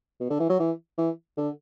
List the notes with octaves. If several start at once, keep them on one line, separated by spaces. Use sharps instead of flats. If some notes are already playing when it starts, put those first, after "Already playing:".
B2
D3
E3
F#3
E3
E3
D3